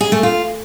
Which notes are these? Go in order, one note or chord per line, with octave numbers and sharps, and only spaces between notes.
G#4
A3
F4